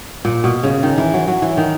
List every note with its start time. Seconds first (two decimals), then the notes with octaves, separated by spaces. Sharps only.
0.25 A#2
0.44 B2
0.64 C#3
0.83 D#3
0.98 E3
1.13 F#3
1.27 F#3
1.42 E3
1.57 D#3